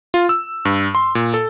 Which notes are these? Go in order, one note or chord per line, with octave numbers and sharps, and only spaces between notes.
F4
E6
G2
C6
A#2
A4